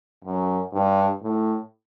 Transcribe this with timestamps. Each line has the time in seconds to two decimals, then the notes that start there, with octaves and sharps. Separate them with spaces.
0.24 F#2
0.73 G2
1.22 A2